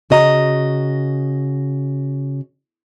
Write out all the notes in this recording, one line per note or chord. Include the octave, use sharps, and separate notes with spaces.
C#3 F#4 D#5 A#5